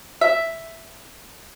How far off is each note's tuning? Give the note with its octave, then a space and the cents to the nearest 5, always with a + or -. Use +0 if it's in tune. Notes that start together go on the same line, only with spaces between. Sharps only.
E5 +0